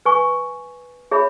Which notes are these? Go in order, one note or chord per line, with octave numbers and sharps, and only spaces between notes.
B4 G#5 C#6
G#4 C#5 E5 B5